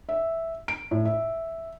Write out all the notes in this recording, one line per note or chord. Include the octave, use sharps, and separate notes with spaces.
E5
D7
A2
E5